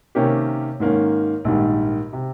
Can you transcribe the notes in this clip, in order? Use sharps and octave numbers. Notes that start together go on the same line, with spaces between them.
C3 D#3 A#3 C#4 G4
G#2 D#3 A#3 C#4
A#1 G#2 D#3 G3
C3